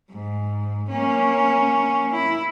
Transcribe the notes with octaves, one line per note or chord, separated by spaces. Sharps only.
G#2
A#3 C#4
E4